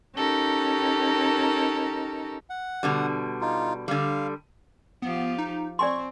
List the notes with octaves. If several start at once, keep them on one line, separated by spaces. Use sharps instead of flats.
C#4 D#4 G4 A4 A#4
F#5
B2 D3 G3
D#4 F4
D3 G3 F5
F3 B3 F4 G4
D#4
C4 D5 G#5 C6 C#6